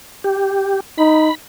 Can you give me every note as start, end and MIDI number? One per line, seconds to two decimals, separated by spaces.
0.24 0.80 67
0.98 1.29 63
0.98 1.35 83